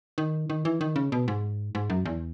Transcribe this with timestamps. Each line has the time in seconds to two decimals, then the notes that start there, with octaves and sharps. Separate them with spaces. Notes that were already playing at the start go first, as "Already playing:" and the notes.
0.18 D#3
0.50 D#3
0.65 E3
0.81 D#3
0.96 C#3
1.12 B2
1.28 G#2
1.75 G#2
1.90 F#2
2.05 E2